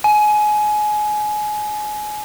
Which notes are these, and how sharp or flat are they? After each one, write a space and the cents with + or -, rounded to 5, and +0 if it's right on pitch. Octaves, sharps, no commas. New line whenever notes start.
G#5 +25